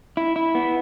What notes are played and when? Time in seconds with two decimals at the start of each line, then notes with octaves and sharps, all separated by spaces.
0.17 E4
0.36 E4
0.55 B3